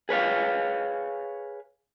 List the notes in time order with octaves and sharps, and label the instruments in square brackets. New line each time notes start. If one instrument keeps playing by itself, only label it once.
[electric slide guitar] G#4 B4 C#5 F5